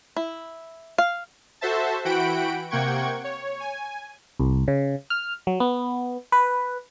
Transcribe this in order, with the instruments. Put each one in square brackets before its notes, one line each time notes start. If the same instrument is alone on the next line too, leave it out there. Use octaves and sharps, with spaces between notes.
[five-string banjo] E4
F5
[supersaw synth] F#4 A4 C5 E5 A5
E3 F#4 F#5 G5 B5 D7
C3 A#3 F#5 G5 C#6 G#6
C#5
G#5
[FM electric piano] C2
C#3
F6
F#3
B3
B4